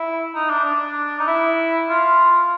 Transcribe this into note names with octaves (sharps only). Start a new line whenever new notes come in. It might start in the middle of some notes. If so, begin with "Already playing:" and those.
Already playing: E4
D#4
D4
D4
D#4
E4
F4